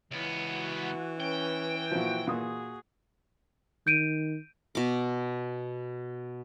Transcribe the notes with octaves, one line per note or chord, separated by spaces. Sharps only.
C#2 E3 B3
F#4
C#4 B4 G5
A#2 F3 E4 F#4
A#2 F#4 G#4 D#6
D#3 G6 D7 D#7
B2 D6